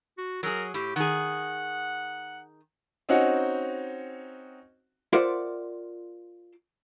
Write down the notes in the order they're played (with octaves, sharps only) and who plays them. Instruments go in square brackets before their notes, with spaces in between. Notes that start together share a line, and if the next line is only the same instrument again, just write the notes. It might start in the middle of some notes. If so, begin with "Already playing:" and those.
[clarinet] F#4
[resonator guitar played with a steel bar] F#3 G#4 [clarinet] A#4
[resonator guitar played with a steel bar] A2 [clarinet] G4
[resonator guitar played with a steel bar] D#3 G#4 [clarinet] F#5
[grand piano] C4 C#4 D#4 F#4 F#5
[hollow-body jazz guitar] F4 A#4 C5 D5 E5 F#5